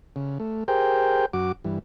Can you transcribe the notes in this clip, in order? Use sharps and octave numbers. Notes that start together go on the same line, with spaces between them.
C#3
A3
G4 G#4 A#4 C5 G5
F#2 F#4 D6
G2 E3